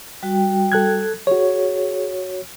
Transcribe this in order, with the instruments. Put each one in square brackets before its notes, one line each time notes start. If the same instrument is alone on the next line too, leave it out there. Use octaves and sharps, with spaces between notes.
[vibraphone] G3 F#4 G5
[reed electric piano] A4 F#6 G#6
[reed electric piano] F#4 C#5 [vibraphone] G#4